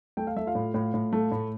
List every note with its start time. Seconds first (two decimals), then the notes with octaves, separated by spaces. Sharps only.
0.17 A3 G5
0.27 F5
0.36 A3 E5
0.46 F4 F5
0.55 A2
0.74 A2
0.94 A2
1.13 A3
1.32 A2